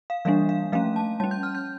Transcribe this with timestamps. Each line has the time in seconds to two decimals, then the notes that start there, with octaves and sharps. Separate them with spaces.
0.10 F5
0.25 E3 G3 A#3 D4 F5
0.49 F5
0.72 F3 A3 C#4 F5
0.96 A5
1.20 G3 C#4 A5
1.31 G6
1.43 F6
1.55 G6